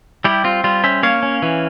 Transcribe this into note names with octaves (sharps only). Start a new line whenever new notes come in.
G3 E4 G4
C4 F4
G3 F4
C#4 C5 E5
A#3 C#5 F5
C#4
E3